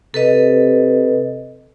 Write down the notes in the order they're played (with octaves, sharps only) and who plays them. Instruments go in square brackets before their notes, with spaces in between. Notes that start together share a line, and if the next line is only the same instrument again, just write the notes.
[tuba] C3 [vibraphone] A4 B4 D#5